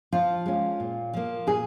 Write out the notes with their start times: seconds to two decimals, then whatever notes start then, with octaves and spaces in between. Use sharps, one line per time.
0.12 F3 F4
0.46 G#3 C#4
0.80 A#2
1.14 F3 A#3
1.47 A#2 G#4